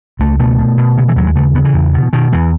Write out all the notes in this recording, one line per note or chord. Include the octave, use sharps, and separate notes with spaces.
C#2 A3
B2 A3
B2
B2
C#3
E3
D#2 F#3
G#3
C#3 A3
C#3 B3
E3
E2
B2
B2 D#3
E2 E3